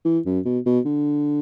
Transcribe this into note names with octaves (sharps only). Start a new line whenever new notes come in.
E3
F#2
B2
B2
D3